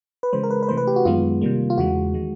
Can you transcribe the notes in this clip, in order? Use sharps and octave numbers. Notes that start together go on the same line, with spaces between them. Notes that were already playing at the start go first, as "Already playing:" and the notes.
B4
C#3 E3 G#3 C5
A#4
B4
B4
C3 E3 A3 C5
B4
G4
F#4
F#2 D#3 G#3 B3 F4
C3 D#3 G3 A#3
F4
E2 C#3 E3 G#3 F#4
D#3 G#3